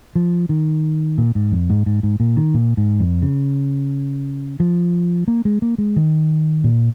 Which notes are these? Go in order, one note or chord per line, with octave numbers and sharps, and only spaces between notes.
F3
D#3
A#2
G#2
F2
G#2
G#2
G#2
A#2
D#3
A#2
G#2
F2
C#3
F3
A#3
G#3
A#3
G#3
D#3
A#2